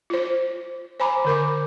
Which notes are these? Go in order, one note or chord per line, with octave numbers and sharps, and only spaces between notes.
F4 C5
C5 G#5 A#5 B5 D6
D3 A#4 D6